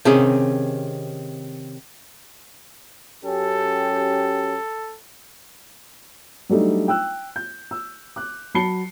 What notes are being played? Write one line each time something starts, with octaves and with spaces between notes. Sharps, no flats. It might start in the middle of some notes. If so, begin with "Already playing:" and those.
C3 D#3 C#4 G#4
F#2 C#4 G4 A4
F#3 G3 A3 D4 D#4
G5 E6 F#6
G6
E6
D6 F#6
F#3 A5 B5 C7 C#7 G7